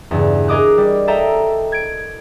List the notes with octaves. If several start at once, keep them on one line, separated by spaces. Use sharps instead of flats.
E2 G2 C#3
G#4 A#4 D#5 D6 D#6 F#6
G3
A4 D#5 E5 G5 A#5
G#6 D7